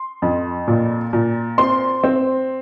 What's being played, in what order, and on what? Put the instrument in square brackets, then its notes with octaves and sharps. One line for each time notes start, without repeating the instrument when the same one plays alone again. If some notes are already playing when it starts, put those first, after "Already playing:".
Already playing: [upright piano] C6
F2
A#2
A#2
C4 C6
C4